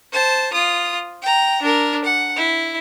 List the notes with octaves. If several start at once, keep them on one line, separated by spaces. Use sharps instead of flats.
C5 A5
F4 D#6
G5 A#5
D4 A#4
F#5
E4